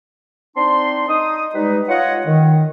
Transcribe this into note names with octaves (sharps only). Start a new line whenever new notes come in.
C4 D4 D#4 A5 C6
D#4 D#6
G3 G#3 D#4 B4
F4 C#5 D#5 F#5
D#3